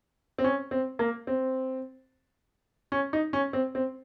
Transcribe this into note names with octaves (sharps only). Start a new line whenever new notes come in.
C4
C#4
C4
A#3
C4
C#4
D#4
C#4
C4
C4